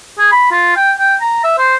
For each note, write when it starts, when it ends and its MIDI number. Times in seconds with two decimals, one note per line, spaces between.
0.19 0.30 68
0.32 0.51 83
0.51 0.73 65
0.77 0.92 79
0.99 1.15 79
1.21 1.44 82
1.44 1.56 76
1.58 1.76 72